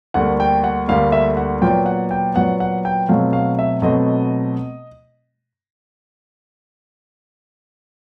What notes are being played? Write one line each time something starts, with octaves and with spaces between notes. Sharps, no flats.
D2 D3 G3 A#3 F#5
G5
F#5
D2 D3 G3 A#3 F5
E5
F#5
A#2 F#3 B3 G5
F#5
G5
A#2 F#3 B3 F#5
F#5
G5
B2 F#3 A3 C4 F5
F5
E5
B2 F#3 A3 C4 D#5